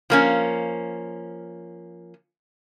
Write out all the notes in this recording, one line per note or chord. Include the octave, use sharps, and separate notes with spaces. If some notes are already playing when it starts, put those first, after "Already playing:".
F3 A#3 C#4